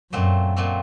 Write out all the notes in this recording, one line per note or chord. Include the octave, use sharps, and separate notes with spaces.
F#2 A#2 F#3 A3 C4
A#2 F#3 A3 C4